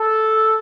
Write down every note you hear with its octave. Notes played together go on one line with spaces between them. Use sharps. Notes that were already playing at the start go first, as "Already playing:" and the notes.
Already playing: A4